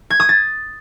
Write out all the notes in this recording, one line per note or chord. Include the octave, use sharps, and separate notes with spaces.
G#6
D#6
A6